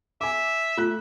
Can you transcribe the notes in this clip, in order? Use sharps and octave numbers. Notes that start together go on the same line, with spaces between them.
E5 G#5 D6
A3 F4 F#6